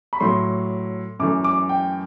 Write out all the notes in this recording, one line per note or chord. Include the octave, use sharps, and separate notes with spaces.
B5
A2 F#3 A3 C6
F#2 E3 A3 D6
D6
G5